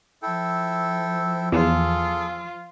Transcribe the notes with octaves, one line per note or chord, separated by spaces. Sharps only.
F3 E4 A4 G5
E2 F4 G#4 A4